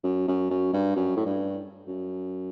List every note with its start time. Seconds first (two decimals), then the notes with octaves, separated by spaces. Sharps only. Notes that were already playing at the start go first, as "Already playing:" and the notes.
0.04 F#2
0.28 F#2
0.50 F#2
0.73 G2
0.96 F#2
1.16 A2
1.26 G2
1.87 F#2